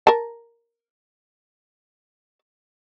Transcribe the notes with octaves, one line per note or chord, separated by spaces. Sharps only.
A#4 A5